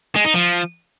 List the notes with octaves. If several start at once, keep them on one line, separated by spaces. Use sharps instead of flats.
G#3
D#4
F3